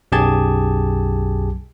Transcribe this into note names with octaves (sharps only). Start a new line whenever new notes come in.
B1 F#2 G4 G#4 A5 G#6